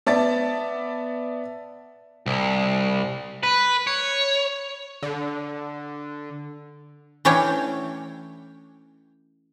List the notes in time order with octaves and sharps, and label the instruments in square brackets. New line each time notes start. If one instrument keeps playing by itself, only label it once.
[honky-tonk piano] B3 D5 E5 A5 A6
[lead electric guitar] C2
B4
C#5
[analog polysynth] D3
[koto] E3 A3 C#4 D4 C#5 G5